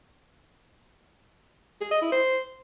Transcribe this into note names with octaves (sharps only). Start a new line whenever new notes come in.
G#4
D#5
E4
C5